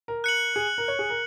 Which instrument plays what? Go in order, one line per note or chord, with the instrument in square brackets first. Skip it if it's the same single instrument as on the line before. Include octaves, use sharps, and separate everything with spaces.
[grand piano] A#4
[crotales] F#6 C#7 F#7
[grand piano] G#4
A#4
C#5
G#4
A#4